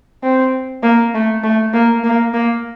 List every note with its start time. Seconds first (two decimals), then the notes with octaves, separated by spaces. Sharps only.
0.23 C4
0.84 A#3
1.14 A3
1.44 A3
1.74 A#3
2.04 A#3
2.34 A#3